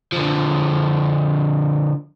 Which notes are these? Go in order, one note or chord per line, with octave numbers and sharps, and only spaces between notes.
D3 F3